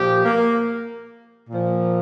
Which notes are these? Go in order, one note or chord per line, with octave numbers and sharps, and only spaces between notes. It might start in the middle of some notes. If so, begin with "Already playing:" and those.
Already playing: A#2 F3 G4
A#3
A#2 F3